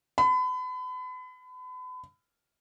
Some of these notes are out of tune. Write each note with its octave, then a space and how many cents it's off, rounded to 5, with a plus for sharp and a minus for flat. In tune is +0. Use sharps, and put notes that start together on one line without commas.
B5 +35